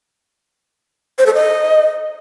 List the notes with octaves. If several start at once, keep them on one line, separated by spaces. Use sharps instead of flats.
C5
A4
D#5